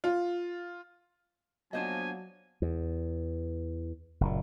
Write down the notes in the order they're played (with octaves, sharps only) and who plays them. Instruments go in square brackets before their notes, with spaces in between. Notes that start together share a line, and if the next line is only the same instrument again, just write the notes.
[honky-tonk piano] F4
[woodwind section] F3 A#3 B3 [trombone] F#3 [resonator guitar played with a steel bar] D4 C5 D#5 [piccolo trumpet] G#5
[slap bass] E2
F#1 A#2